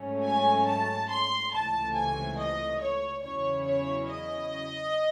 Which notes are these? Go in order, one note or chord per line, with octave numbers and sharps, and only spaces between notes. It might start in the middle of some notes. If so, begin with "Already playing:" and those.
Already playing: G#2 F#3 A3 C#4
G#5
A5
C6
C#2 C3 E3 A3 A5
G#5
D#5
C#5
E2 C#3 F#3 C#4 E4 C#5
C#5
D#5